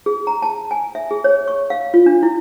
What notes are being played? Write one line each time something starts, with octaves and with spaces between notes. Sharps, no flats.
G#4
A#5
A5
G#5
E5
G#4
C#5
C#6
F5
F4
D4
E4